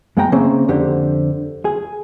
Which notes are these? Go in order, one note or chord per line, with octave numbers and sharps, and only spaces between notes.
F#2 G#3 B3 F#5 G5 A#5
C#3 A#3 C4 C#4 C5 E5
F2 D3 G4 C5
G#4